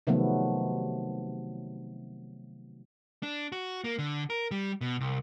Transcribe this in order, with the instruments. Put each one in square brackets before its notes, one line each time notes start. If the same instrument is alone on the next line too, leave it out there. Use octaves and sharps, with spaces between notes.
[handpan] C3 D#3 F3 F#3 A3 B3
[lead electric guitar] D4
F#4
A#3
D3
A#4
G3
B2
C2